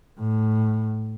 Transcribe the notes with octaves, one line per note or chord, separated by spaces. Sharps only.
A2